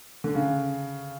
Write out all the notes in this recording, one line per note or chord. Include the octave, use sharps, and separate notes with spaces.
D3
C#3